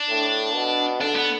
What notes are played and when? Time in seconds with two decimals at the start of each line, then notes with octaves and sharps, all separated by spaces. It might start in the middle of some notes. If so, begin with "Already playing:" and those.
Already playing: D4
0.09 A2
0.54 B2
1.01 D3 D4
1.16 B3